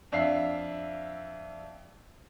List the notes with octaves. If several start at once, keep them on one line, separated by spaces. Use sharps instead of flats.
F2 D4 E5 F5 C7